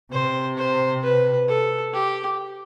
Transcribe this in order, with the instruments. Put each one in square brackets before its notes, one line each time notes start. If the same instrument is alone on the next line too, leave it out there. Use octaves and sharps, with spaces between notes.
[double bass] C3 [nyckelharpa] C5
[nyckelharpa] C5
B4
A4
G4